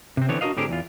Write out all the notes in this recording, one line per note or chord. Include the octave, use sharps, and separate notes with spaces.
C3 C4
D3 E3 B3 C4 C#5
D4 F#4 G#4 A#4 D#5 F5
A2 D3 C4 G4 G#4 A#4
E2 E3 F4